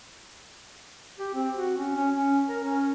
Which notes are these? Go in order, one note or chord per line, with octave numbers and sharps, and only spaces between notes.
G4
C4
F#4
C#4
C#4
C#4
A#4
C#4